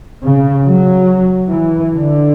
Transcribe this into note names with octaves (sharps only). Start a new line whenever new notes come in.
C#3
F#3
E3
D3